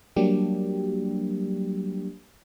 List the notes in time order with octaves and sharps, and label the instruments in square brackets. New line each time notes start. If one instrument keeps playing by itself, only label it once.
[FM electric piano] F#3 G3 A#3 D4 G4